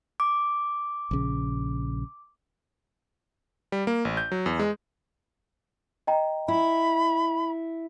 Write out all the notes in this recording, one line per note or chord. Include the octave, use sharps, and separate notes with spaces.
D6
A#1 C#3
G3
A#3
A1
G6
F#3
E2
G#3
D#5 G5 A#5
E4 B5